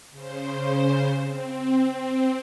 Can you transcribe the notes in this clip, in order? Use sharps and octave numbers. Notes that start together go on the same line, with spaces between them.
C#3 C5
C4